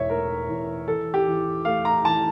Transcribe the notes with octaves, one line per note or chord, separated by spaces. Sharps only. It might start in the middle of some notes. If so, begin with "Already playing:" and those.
Already playing: E1 E2 C#5 E5
A3 A#4
E2
E3 A4
G4
E3
A3 F5
A#5
E3 A5